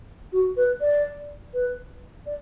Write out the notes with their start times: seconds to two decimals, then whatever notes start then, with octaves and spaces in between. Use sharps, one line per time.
0.33 F#4
0.57 B4
0.81 D5
1.54 B4
2.26 D5